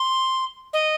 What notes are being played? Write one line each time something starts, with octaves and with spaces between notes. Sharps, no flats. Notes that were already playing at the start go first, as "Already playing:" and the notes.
Already playing: C6
D#5